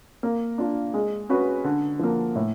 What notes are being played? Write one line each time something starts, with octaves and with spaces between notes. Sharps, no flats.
A#3
D4 F4
G#3
C#4 F#4 B4
D3
F3 A#3
A2